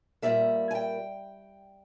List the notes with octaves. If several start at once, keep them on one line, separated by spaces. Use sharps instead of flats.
A#2 G3 A#3 E5
G#5
G5